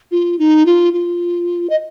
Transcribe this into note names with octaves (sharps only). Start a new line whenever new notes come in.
F4
D#4
F4
F4
D#5